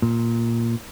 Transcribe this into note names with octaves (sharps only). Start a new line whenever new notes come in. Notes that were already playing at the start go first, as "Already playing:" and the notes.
A#2